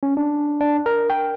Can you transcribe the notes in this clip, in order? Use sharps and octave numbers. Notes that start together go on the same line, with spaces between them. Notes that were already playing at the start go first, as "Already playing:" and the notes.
C#4
D4
D4
A#4
G5